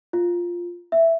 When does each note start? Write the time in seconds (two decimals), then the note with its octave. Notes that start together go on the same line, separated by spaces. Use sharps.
0.13 F4
0.92 E5